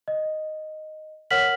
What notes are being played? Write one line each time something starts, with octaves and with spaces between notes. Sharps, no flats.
D#5
A#4 C#5 F#5 F6 B6 F#7